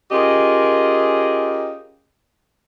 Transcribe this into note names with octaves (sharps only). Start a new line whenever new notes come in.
C#4 F4 G4 G#4 A#4 D#5